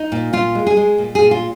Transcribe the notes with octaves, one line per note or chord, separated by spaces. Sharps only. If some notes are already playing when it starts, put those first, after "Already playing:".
Already playing: D#4
A#2
A#2 F4
G#3
G#4
G#3
A#2
G#4
A#2
F4